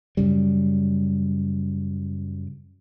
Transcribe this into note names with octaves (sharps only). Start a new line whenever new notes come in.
F#2 C#3 G3